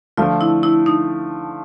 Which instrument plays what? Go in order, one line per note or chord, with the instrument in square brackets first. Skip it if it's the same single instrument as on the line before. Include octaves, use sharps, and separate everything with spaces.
[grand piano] D3 F3 A3 [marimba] F4
[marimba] E4
E4
D#4